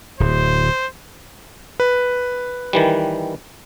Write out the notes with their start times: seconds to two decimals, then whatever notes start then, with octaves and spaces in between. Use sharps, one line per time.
0.20 D1 C5
1.80 B4
2.73 D#3 E3 G3